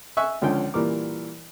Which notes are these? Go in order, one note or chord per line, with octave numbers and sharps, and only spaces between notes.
E5 G#5 C#6 F#6
C#2 D3 F3 C#4 G5
A#2 E3 G3 A#4 D6